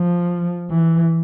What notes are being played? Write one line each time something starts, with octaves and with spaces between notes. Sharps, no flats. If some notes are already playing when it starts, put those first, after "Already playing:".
Already playing: F3
E3